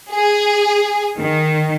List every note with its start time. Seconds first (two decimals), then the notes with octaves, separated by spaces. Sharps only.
0.12 G#4
1.18 D#3